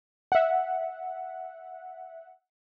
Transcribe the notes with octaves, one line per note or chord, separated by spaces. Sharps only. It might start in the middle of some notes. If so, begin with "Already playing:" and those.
E5 F#5